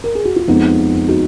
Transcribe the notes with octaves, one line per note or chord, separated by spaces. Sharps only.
A#4
G#4
F#4
F4
F2 F3 G#3 B3 D#4
D#4 F#4